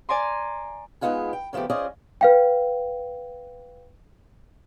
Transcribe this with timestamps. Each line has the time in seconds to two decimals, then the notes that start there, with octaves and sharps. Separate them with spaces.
0.09 D5 G#5 A#5 C6
1.01 G#3 A3 B3 D#4 F4 G#4
1.33 G5
1.53 C#3 F3 A3 B3 G4
1.70 C#4 F4 G#4 C5 D5 D#5
2.21 B4 F5 G5